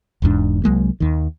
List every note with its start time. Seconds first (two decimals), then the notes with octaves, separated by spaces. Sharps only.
0.22 E1 E2 G#2 D4
0.64 C2 F#3 G#3 A#3
1.00 D#2 D#3